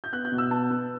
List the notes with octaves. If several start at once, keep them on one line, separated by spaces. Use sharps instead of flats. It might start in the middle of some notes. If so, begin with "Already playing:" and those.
G6
B3 F#6
G6
B2
E6
B3 A5
B3